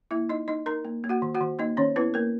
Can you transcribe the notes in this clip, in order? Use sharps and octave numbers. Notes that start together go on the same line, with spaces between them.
A#3 E4 E5
D#4 D#5
D#4 D#5
D#4 A#4 A#5
A#3
A#3
F#4 F#5
D#3
F#4 F#5
D#3
A#3 D#4 D#5
D#3 C#4 C#5
B3 E4 B4
A#3 A#4